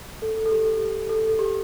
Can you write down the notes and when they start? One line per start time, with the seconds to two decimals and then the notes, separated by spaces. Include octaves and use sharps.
0.22 A4
0.46 A4
0.51 G4
1.09 A4
1.39 G4